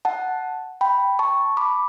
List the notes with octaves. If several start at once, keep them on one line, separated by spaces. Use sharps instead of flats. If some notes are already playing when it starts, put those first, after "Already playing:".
F#5 A5
G5 B5
A5 C#6
B5 D6